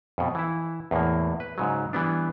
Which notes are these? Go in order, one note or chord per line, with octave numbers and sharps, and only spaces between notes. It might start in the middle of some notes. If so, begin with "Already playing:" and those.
F2 B2
E3 E4
E2 A2 A#3
B4
G#2 C#3 F#3
E3 G3 B3 D4